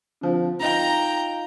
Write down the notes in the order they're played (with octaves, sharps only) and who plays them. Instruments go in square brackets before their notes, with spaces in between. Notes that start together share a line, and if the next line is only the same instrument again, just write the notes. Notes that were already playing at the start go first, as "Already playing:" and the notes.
[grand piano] D3 F3 C4
[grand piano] D#4 F4 D#5 [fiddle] G5 A#5